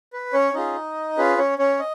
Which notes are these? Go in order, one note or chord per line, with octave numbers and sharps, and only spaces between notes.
B4
C#4 C#5
C#4 D#4 F4 G#4 D#5
C#4 F4 G#4 B4
C#4 C#5
C#4 C#5
D#5